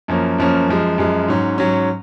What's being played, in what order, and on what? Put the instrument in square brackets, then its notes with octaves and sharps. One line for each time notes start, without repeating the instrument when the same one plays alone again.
[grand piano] F#2 F3 A#3 C#4
F#2 F3 A#3 C#4
F#2 F3 G#3
F#2 F3 G#3
G#2 F#3 C#4
G#2 F#3 C#4